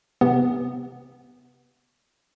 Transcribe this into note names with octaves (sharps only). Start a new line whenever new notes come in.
C3 B3